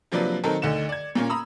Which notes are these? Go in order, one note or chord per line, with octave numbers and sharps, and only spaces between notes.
C3 F3 F#3 A#3 D4 B4
D#3 F#3 C4 D#4 A4 A#4
D2 D3 D#4 C#7 E7
D5 G#6
A#2 A#3 C#4
A#5 B5 D#6 E6